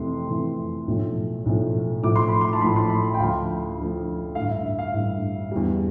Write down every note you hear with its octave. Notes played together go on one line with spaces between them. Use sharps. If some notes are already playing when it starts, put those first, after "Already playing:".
Already playing: F2 C3 E3 A3 C6
F2 C3 E3 A3
B1 A2 F3 A3
B1 A2 F3 A3
A1 A2 F3 A3 D6
C6
B5
C6
A5
A1 A2 F3 A3 B5
C6
B5
G5
D2 D3 F3 A3 F5
D2 D3 F3 A3
A1 G2 D3 F5
E5
E5
F5
A1 G2 D3
E2 D3 G3